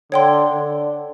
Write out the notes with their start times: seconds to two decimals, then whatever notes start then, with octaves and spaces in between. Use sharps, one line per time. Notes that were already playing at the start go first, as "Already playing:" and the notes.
0.12 D3 C#5 G5 C6
0.53 D3